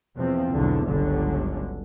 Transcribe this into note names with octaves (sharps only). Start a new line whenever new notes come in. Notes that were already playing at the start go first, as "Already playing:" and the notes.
E2 B2 F3 C4
B1 E2 D3
G1 C#2 D3 F#3